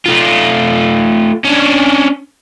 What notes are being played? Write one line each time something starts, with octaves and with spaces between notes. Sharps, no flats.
A3 F4
C#4 D4